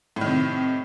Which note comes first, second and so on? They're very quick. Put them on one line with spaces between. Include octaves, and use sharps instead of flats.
A2 D#3 C3